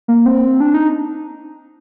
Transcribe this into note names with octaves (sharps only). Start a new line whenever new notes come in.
A#3
C4
D4
D#4